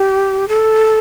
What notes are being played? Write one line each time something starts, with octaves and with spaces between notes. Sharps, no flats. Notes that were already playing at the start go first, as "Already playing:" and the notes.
Already playing: G4
A4